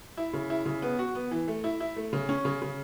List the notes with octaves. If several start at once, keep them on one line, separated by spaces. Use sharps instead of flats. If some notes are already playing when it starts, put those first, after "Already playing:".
E4
C#3
E4
C#3
B3
F#4
B3
E3
A3
E4
E4
A3
C#3
C#4
C#3
C#3